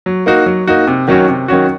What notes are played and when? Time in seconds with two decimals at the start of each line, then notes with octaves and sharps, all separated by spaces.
0.06 F#3
0.26 A#3 D#4 F#4
0.46 F#3
0.67 A#3 D#4 F#4
0.87 C3
1.08 D#3 F#3 C#4 F#4
1.28 C3
1.48 D#3 F#3 C#4 F#4